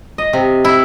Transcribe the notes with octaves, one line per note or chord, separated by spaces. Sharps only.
D#5
C3
E4